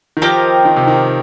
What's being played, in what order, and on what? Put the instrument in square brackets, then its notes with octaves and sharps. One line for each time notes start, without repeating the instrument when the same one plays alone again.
[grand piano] D#3
[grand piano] F3 [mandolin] C4 G4 A#4 D#5
[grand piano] D#3
C3
D#3